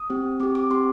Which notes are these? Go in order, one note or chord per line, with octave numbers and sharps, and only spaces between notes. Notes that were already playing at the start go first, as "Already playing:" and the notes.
Already playing: D#6
C4 G4
C4 G4 D6
D6
C4 G4 C6